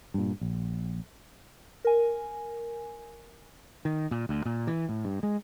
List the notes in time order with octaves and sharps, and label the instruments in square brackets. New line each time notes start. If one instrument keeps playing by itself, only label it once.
[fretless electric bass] G2 A#2
A#1
[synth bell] A#4 G#5
[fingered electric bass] D#3
A#2
D2
A#2
E3
A2
G2
G#3